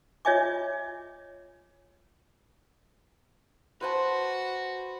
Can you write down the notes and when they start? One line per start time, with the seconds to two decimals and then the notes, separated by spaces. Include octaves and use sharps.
0.25 F4 C#5 D#5 E5 G#5 D6
3.81 F#4 B4 C5 A5